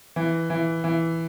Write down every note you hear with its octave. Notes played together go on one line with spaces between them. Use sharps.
E3
E3
E3